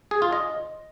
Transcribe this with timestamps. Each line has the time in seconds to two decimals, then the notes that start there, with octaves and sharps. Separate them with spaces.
0.11 G#4
0.22 F4
0.33 D#5